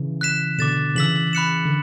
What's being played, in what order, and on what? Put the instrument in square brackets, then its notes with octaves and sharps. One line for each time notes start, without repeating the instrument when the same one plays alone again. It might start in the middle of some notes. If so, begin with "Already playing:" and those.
Already playing: [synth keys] C#3 E3
[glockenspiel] F#6 B6 E7
[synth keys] B2 D3 [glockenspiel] D6 A6 E7
[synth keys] C#3 E3 [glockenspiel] E6 B6 F#7
[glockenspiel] B5 F#6 C#7 E7
[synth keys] D3